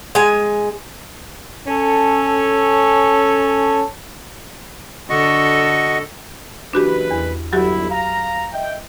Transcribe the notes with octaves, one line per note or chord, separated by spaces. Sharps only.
G#3 G#5
C#4 A4
D3 F#4 A4 D#5 C#6
F#1 E3 D4 F#4 G4 B4
E2
G1 F#3 E4 F#4 G4
F5 A#5
D#5 E5 G5